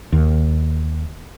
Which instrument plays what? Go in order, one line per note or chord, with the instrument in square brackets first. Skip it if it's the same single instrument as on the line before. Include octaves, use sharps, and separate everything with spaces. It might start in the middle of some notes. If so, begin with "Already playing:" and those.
[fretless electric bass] D#2